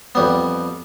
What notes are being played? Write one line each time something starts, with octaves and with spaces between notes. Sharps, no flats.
F2 G3 B3